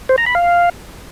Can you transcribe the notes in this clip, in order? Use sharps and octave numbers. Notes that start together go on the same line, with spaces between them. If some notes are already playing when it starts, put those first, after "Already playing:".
C5
A#5
B5
F5